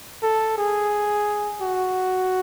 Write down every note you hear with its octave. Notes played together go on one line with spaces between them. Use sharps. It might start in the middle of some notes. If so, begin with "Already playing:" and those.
A4
G#4
F#4